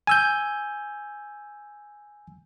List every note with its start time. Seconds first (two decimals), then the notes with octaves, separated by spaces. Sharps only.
0.07 G#5 E6 G6